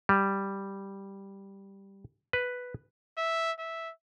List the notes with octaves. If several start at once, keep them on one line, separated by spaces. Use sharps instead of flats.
G3
B4
E5
E5